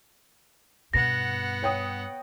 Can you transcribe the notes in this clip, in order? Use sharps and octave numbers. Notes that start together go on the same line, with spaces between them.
G2 B2 B3 F#5 A#6
C#5 G5 D#6